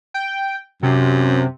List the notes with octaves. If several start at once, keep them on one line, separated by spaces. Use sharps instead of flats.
G5
F#2 C3